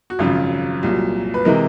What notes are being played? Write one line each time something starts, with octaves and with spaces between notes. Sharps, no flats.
F#4
G#1 F#2 C#3 F3 F4
C2 A#2 F#3
B4
C3 E3 G#3 A#4